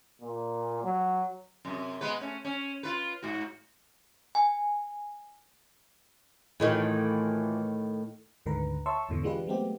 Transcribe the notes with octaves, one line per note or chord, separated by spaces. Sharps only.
A#2
F#3
F#2 C3
G#3 B3 B4
A3 C#4
C#4
F4 B4
G#2 F#4
G#5
A2 D#3 E3 A3 F4 B4
D2 G#2 D3 D#3 B4 A#5
C#5 E5 A5 C6 C#6 E6
E2 G#2 B2 D3 E3
E3 G#3 D4 F4 G4 B4
F#3 G#3 A3 B3 C4 G4